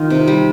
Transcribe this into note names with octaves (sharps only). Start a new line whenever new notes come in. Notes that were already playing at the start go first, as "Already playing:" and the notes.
Already playing: D#3 D#4 F4
C3
G3